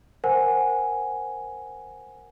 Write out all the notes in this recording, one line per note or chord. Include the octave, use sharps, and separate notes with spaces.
A#4 C5 F#5 G#5